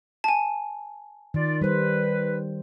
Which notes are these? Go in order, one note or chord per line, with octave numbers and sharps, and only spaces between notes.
G#5 A5
D#3 F4 D5
G3 B4 C5